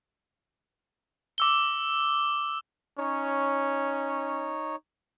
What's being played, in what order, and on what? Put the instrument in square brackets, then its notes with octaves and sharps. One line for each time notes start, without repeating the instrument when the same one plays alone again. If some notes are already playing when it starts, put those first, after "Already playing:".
[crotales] D6 E6 G7
[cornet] C#4 [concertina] D#4 C#5